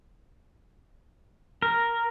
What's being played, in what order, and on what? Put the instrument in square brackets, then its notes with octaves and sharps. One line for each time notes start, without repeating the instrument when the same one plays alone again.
[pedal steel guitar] A#4